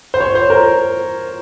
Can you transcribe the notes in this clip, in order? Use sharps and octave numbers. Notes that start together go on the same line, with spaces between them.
C5
C#5
C5
A#4